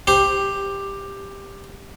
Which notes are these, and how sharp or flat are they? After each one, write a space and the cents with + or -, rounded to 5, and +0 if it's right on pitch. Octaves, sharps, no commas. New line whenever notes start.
G4 +10 C5 +0